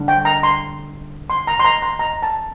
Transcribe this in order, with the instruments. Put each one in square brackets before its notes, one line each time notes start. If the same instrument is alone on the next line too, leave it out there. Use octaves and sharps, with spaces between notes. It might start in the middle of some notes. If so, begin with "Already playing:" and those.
Already playing: [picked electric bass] D3 G3 D4
[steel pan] G5
A#5
C6
C6
A#5
C6
A#5
C6
A#5
A5